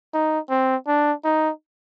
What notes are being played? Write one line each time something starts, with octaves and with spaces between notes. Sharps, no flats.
D#4
C4
D4
D#4